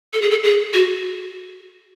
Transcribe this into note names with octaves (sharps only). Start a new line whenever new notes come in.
A4
G#4
A4
G#4
F#4